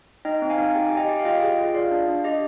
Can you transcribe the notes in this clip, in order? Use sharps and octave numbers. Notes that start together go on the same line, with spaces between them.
D#4 D#5 G5
C4
F5 G#5
D#4
G4 G5
G4 G#5
D#5 G5
G4
F5
F4 D#5 G5
G#4
F4
F4 D5 F5
D4
D4
G4 D#5